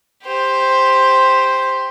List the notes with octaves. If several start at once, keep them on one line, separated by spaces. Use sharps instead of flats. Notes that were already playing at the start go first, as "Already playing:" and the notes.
G4 C5